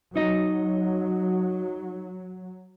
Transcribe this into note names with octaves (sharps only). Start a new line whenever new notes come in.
F#3 D#4 D#5